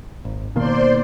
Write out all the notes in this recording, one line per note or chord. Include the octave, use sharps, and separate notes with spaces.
G#1
B2 D#3 A#3 C5 D5 C6